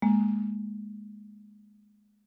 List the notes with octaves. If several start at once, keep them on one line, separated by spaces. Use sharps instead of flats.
G#3 A#3